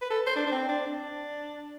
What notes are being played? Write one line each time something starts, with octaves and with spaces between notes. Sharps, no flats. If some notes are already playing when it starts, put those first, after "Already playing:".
B4
A4
C5
D4
D4
C4
D4
D4